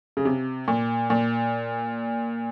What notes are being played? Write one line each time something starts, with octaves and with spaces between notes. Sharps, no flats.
C#3
C3
A#2
A#2